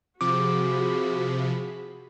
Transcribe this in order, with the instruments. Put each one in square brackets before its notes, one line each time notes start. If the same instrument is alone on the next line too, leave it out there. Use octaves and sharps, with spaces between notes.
[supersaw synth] C3 F3 [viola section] F#4 G#4 B5 [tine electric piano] D6